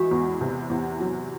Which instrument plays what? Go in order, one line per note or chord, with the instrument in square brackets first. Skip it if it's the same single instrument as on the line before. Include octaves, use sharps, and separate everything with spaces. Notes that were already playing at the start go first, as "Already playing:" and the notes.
Already playing: [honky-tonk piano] E3 G#3 [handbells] F#4
[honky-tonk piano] E2
C3
E2
F#3